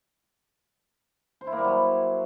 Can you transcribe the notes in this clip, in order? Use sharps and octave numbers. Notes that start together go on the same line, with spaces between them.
C5
E4
A#3
G3
F#3